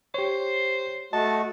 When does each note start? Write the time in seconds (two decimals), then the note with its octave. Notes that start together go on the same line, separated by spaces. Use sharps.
0.14 G4 C5 C#5
1.13 A3 F#4 D#5 A5